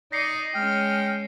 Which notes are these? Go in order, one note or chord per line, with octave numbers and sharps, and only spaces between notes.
D#4 D5 D#5 A#6 C7 C#7
G#3 C#4 G5 F6